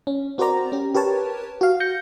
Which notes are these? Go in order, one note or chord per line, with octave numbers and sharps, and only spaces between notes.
C#4
C4 F#4 A#4 C5 D5 A#5
C#4 G4
G4 A#4 B4 C#5 A5
F#4 F5
G6 A#6 C#7